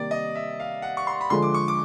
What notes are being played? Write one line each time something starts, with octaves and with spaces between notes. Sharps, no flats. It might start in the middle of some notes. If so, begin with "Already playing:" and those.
Already playing: C3 D#3 G3 A#3 D5
D#5
E5
F5
F#5
C#6
C6
B5
D3 F3 G#3 C6
D6
C#6
D6